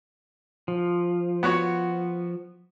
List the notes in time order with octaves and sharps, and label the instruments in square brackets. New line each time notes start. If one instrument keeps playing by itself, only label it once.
[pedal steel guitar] F3
[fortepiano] B3 F#4 C#5